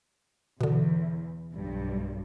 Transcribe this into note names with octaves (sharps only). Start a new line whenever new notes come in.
E2 B2 D3
B1 G2